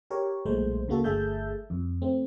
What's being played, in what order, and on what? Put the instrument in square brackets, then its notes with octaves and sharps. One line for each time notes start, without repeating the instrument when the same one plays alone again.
[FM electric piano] G4 A#4 C#5
B1 A#2 G#3 A3 C5
C#2 C#3 A#3 F#4 A4
G1 A3 G#4 E5 A5 G6
F2
A3 C4